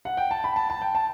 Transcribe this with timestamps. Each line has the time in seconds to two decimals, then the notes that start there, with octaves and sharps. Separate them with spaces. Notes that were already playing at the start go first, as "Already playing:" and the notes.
0.05 F#5
0.17 G5
0.31 A5
0.44 B5
0.56 A5
0.70 A5
0.81 G5
0.95 A5